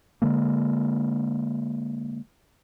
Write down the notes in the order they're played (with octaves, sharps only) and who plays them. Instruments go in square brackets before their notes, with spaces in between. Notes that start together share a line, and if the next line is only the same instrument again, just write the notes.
[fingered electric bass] D3 G#3 A#3